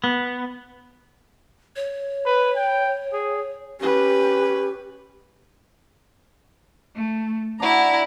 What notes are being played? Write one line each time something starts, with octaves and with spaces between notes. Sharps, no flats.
B3
C#5
B4
G5
G#4
C#4 G4 B4
A3
D4 E4 F#4 A#5